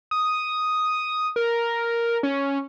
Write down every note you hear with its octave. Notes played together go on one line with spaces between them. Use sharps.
D#6
A#4
C#4